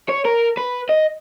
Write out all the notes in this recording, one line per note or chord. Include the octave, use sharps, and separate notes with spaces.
C#5
A#4
B4
D#5